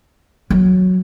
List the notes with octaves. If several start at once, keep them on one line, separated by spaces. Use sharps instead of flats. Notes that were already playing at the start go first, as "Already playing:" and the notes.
F#3